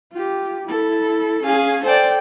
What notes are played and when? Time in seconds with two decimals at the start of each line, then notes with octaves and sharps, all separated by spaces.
0.13 F4 G4
0.65 E4 A4
1.44 C#4 G#4 F5 G#5
1.84 A4 C5 D5 G5